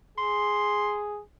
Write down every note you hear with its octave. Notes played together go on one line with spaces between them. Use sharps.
G#4 C6